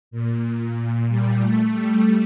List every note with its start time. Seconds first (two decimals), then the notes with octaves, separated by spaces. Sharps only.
0.11 A#2
0.75 A#2
1.08 G3
1.39 A3
1.72 G3